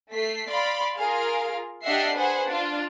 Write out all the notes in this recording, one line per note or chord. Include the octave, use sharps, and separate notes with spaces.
A3 B6 C7
D5 F5 B5 C6
F4 G#4 A#4 F5
D4 G4 D#5 E5 F#5 C7
G#4 B4 C5 F#5
D4 F4